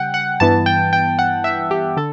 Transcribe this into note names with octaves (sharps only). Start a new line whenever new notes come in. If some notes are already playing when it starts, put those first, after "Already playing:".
Already playing: C#3 G3 F#5 G5
F#5
G2 E3 B3 A5
G5
G5
F#5
E5
G4
D3 A4